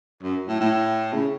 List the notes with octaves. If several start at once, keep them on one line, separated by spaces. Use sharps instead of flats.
F#2
A2
A2
C#3